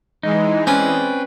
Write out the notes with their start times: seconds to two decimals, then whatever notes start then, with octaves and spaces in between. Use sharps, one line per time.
0.23 E3 G#3 D#4
0.67 C4 C#4 B4 D5